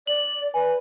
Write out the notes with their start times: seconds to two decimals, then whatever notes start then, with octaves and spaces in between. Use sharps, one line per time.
0.07 D5 F#7
0.54 B4 G#5